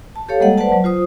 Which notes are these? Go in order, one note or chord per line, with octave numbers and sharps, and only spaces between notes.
A5
G4 A4 C#5 F5
G3 G#3 A#3 A4 D#5 F#5
B4 C5 D5 F#5 A5
F#3
F4 C5 D#6